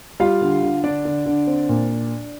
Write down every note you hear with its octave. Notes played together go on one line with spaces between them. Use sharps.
G3 F4 F5
D3
D3
D3 D4 D5
D3
D3
C4
A#2